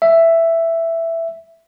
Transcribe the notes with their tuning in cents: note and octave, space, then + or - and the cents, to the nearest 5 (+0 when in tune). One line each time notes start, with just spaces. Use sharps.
E5 +5